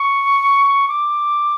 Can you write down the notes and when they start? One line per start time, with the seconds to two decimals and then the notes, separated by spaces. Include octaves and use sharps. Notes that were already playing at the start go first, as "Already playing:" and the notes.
Already playing: C#6
0.88 D6